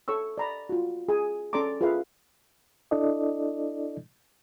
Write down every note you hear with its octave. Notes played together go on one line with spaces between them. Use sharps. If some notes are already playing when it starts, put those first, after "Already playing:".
A4 C#5 C#6 E6
D5 A#5 B5
F4 F#4
G#4 G#5
C#4 A4 D5 A#5 C6 D6
F4 G#4 B4 E5 F5
D4 E4 A4 D5 D#5